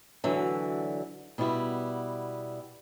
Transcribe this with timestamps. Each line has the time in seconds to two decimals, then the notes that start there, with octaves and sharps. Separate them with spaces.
0.24 D2 D3 E3 F#3 E5
1.38 B2 G3 B3 E4